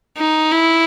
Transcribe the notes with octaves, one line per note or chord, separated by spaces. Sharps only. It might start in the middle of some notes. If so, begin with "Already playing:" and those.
D#4
E4